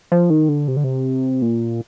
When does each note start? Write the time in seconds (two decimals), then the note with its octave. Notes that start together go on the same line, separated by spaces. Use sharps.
0.12 F3
0.30 D#3
0.49 D3
0.68 C3
0.77 D3
0.84 C3
1.42 A#2